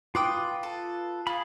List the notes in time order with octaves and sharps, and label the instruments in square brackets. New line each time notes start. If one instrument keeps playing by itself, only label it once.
[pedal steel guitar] F4 B4 D#6 [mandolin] G5 C6 D6
[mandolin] A4
[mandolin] F4 [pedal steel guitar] G#4 B5